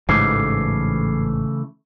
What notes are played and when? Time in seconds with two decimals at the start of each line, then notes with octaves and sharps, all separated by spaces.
0.09 A1 G#2 C#3 E3 A3 D6 G#6 C7